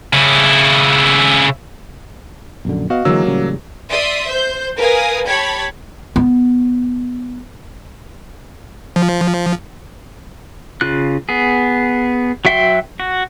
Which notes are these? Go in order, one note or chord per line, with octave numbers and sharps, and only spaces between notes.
C#3 E4
A#1 F#2 D3
B3 F#4 D#5 F5
D3 E3 F#3 G#3 A#3 E6
A1 C#3 G3
D5 E5 C6 D#6
C5 G6
A#4 B4 F5 G#5 D#6
G4 C#5 A5 B5 G#6
B3
F3
C#3 F4 F#6
B3 G#4
F#3 F#4 E5 G5 C6
F#4